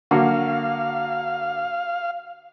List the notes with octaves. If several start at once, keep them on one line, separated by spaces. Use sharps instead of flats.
D3 A#3 F#4 F5